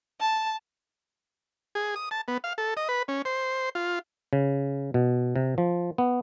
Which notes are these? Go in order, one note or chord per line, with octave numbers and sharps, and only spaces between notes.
A5
G#4
D#6
A5
B3
F5
A4
D#5
B4
C#4
C5
F4
C#3
B2
C3
F3
B3